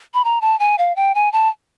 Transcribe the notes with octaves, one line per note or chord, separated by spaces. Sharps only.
B5
A#5
A5
G#5
F5
G5
G#5
A5